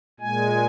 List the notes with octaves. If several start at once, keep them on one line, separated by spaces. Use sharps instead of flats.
A#2 G#3 G#5